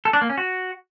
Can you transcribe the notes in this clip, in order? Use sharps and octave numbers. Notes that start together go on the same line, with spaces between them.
A4
D4
A#3
C#4
F#4